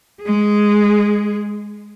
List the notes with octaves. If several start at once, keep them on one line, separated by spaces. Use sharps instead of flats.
G#3 G#4